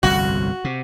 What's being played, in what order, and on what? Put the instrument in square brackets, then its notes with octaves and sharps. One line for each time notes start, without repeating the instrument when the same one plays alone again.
[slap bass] G1 C2 F2 [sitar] F#4
[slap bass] C3